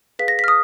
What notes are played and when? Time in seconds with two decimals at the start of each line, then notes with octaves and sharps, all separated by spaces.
0.19 G#4 B4 F5 B6
0.28 A#6
0.39 B6
0.44 F6
0.48 D#6